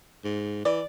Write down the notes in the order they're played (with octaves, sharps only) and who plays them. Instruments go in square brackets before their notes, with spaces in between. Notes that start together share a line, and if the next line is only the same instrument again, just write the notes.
[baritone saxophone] G#2
[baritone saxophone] E3 [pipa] D5